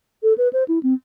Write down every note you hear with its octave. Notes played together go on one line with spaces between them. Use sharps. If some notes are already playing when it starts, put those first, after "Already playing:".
A4
B4
C5
E4
C4